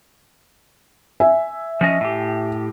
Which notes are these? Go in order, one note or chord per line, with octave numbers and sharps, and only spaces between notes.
E5 G#5
F3 C#4 D#5
A2 G4